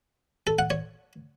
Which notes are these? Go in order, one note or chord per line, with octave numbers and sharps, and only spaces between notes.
A4
F#5
C#5